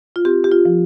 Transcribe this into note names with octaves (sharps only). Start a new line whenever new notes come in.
F4
C4 G4
G4
F4
F3